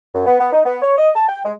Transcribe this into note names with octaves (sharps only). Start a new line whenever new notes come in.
F#2
B3
B3
D#4
B3
C#5
D#5
A5
G5
G#3